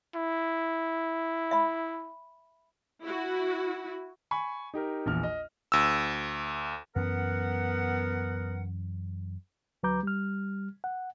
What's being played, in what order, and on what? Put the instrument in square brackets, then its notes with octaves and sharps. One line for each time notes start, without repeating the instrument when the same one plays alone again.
[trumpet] E4
[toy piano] E5 B5
[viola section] E4 F#4
[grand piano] G#5 B5 C#6
D#4 G4 A#4
A#1 E2 F6
D#5
[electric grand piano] D2 E6
[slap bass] F#2 E3 C#4 [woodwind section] B3 A#4 F#5
[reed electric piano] D2 F#3 B4 A#5 D6 G6
G3 F6
F#5